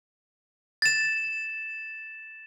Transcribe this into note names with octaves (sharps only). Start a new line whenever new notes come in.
A6 E7